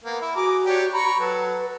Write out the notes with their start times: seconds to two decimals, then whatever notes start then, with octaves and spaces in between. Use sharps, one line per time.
0.04 A#3 B3
0.22 E4
0.36 F#4 G#4 A#5 D6
0.65 D4 G4 C#5
0.93 A#5 B5 C#6
1.20 F#3 A4 B4